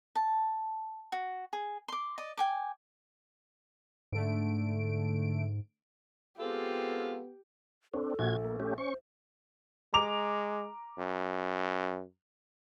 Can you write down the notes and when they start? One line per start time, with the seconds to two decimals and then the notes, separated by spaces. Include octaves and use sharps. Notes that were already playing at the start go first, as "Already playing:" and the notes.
0.15 A5
1.12 F#4
1.53 G#4
1.88 C6 D6
2.18 D5 D#5
2.37 G5 G#5 D6
4.12 G#2 D3 A3 D7
6.39 G#3 B3 C4 F4 G4 A4
7.94 C4 D4 A4 C#5
8.19 A#1 A#2 F#4 G#6
8.45 A#3
8.60 A3 C#4 G4
8.78 C#4 C5 C#6
9.94 G#3 A#5 D6 F7
10.98 F#2